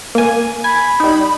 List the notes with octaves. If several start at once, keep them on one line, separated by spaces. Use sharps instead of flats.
A#3 G#5
G#5 B5
G3 D#4